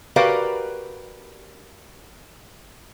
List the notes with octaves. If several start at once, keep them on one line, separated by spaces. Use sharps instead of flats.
F#4 G4 A#4 B4 D5 F5